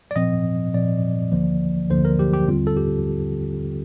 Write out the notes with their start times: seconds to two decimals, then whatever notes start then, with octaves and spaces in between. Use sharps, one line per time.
0.11 D5
0.16 A#2 F3 C4 D#5
0.74 A#2 F3 C4 D5
1.32 D2 D3 F3 A#3
1.90 D2 D3 F3 A#3 C5
2.05 A#4
2.19 G4
2.33 G4
2.48 D#2 D3 G3 C4 F4
2.67 A4
2.77 G4